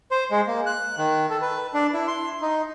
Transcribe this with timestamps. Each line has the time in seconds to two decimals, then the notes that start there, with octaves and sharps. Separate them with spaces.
0.11 C5
0.31 G#3
0.47 A#3
0.66 F#6
0.97 D#3
1.30 A4
1.42 B4
1.74 D4
1.93 E4
2.08 C6
2.42 D#4